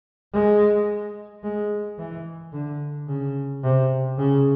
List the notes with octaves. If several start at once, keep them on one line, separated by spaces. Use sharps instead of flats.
G#3
G#3
E3
D3
C#3
C3
C#3